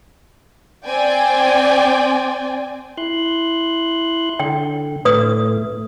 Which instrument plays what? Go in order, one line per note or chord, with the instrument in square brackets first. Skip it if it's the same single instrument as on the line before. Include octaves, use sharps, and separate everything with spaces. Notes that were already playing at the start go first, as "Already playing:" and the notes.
[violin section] C4 D5 G5 G#5
[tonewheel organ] E4 C6 F#6
[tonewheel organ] D3 [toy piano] G5
[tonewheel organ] A2 A3 [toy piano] B4 D#6